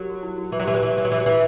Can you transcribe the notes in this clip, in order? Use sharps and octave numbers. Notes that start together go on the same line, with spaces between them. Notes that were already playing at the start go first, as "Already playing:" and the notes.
Already playing: F#3 G4 A#4
F#4
E4
F#4
E3
F#3
E3 G4
F#3 B4
E3
F#3 B4
E3
F#3
E3
F#3
E3